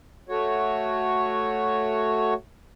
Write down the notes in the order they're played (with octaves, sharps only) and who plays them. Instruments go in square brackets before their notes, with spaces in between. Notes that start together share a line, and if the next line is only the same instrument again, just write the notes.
[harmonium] A3 F#4 C#5